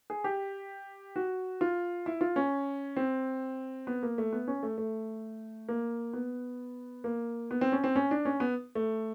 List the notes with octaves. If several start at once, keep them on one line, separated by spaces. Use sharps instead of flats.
G#4
G4
F#4
F4
E4
F4
C#4
C4
B3
A#3
A3
B3
C#4
A3
A3
A#3
B3
A#3
B3
C4
C#4
C4
C#4
D4
C#4
B3
A3